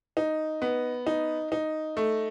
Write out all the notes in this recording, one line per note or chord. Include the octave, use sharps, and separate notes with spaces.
D#4
B3
D#4
D#4
A3